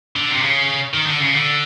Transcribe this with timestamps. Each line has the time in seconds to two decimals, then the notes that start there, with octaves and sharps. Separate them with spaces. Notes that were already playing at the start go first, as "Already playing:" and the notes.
0.16 D3
0.31 C3
0.42 C#3
0.94 D#3
1.06 D3
1.21 C#3
1.34 D3